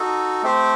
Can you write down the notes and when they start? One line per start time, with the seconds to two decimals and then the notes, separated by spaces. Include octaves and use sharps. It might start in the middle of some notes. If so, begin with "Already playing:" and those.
Already playing: D#4 F#4 A4
0.43 A3 C4 G4 C5